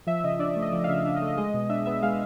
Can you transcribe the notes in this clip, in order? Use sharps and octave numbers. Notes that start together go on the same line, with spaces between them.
F3 E5
C#3 D#5
D4 D5
A3
D#5
F3 D5
F5
C#3 E5
D4 E5
D#5
A3
D#5
G#3 D#5
B2
D4 E5
B3 E5
G#3 F5